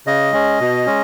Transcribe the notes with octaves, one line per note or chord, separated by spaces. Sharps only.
C#3 D#5
G#3 C#4
B2
G#3 C#4